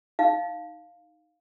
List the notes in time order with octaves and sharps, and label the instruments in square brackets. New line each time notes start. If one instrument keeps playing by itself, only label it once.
[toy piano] D#4 F5